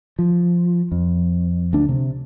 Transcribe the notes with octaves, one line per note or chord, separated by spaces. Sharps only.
F3
F2
D2 D4
C3